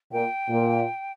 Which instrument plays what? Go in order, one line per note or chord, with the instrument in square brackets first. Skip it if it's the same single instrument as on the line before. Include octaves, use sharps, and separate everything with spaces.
[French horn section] A#2 [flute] G5
[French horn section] A#2